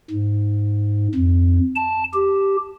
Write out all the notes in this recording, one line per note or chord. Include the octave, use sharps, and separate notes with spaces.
G#2
F2
A5
G4